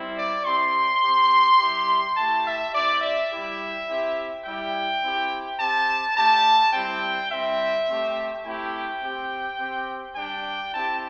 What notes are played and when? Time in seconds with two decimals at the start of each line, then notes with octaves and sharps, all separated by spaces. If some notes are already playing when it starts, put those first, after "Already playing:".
Already playing: G3 C4 E4
0.17 D5
0.45 C4 E4 G4 C6
1.03 C4 G4
1.59 G3 E4 G4
2.16 A3 E4 G4 A5
2.45 E5
2.73 C4 E4 G4 D5
3.02 E5
3.31 G3 E4 G4
3.87 C4 E4 G4
4.44 G3 E4 G4 G5
5.01 C4 E4 G4
5.59 C4 G4 A5
6.16 A3 D4 G4 A5
6.73 G3 C4 E4 G4 G5
7.30 G3 C4 E4 E5
7.87 A3 C4 G4
8.44 A3 C4 E4 G4 G5
9.01 C4 G4
9.59 C4 G4
10.15 G3 D4 G4 G5
10.73 C4 E4 G4 A5